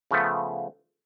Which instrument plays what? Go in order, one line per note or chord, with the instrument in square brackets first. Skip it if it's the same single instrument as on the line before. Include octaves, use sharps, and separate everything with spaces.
[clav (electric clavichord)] C#3 F3 A3 B3